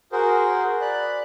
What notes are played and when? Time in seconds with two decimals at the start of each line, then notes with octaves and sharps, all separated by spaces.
0.12 F#4 G#4 A#4 C5
0.81 D5 B5 F#6